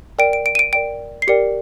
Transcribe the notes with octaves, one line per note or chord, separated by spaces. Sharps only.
A#4 D5 G5 D7
D7
D7
D#7
D7
A#4 D5 G5 D7
C7
G4 A#4 D5 G5 C#7